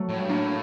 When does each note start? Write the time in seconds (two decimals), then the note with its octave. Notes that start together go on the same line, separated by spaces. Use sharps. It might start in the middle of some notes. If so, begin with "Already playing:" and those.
Already playing: F#3 A3
0.09 A2
0.19 G2
0.29 A2 A#3 D4